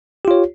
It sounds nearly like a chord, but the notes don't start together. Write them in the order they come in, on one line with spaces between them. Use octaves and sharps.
G4 F4 C#5